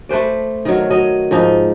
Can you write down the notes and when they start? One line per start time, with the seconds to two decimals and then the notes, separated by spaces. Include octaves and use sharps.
0.09 A3 B4 C5 D5
0.65 D#3 F#3
0.90 F#3 D#5
1.31 G#2 F3 D#4